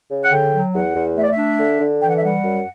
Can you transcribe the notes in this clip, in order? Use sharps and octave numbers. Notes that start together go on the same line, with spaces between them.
C#3
F#5
D3 G5
F#3
E2 F#5
E2
A3 E5
D5
E5
D4
D3
D3
E3 G5
F#5
E5
G3 F#5
F#2